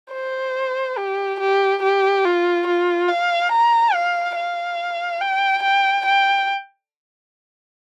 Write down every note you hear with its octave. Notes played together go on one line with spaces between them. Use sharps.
C5
G4
G4
G4
F4
F4
F5
A#5
F5
F5
G5
G5
G5